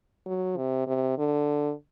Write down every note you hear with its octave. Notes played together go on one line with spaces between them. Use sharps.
F#3
C3
C3
D3